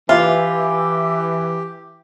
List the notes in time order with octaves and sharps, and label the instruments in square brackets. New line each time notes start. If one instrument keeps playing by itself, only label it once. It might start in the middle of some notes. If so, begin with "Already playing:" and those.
[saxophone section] E3 [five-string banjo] F4 [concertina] G4 [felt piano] E5